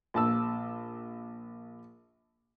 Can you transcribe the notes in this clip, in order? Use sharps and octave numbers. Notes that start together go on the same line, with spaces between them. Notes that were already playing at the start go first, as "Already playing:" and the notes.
A#1 A5 E6